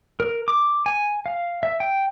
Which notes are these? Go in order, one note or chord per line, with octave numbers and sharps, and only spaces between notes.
A#4
D6
G#5
F5
E5
G5